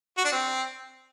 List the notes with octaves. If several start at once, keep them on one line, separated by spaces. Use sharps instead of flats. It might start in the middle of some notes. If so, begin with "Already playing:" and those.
F#4
D4
C4